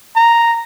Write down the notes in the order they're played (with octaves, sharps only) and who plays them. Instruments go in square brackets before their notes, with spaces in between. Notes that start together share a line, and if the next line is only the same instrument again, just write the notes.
[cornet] A#5